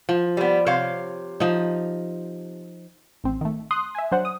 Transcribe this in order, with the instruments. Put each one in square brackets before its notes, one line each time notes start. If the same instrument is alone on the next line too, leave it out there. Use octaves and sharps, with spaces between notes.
[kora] F3
[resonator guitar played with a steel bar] G3 B3
[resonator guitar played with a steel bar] C3 F5 [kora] C5 C#5
[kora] F3 D#4
[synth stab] A1 C4
D#3 A3
C6 D#6 F#6
E5 G#5
F#3 D4 C5 F#5
D#6